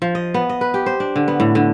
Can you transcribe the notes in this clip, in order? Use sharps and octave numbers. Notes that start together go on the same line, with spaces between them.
F3
D#5
B3
D#5
B4
G4
C5
D4
D3
B3
A2
D3